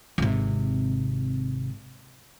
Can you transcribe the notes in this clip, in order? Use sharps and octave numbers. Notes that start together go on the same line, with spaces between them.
G#1 C3